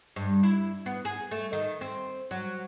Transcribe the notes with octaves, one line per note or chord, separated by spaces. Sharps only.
G2
E4
B3
G#4
A3
D#3
C4
F#3